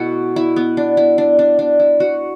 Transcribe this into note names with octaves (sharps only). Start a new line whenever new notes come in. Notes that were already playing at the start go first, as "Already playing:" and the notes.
Already playing: B2 A3 E4 F#4
E4
B3
D4
E4
D4
D4
D4
E4
F#4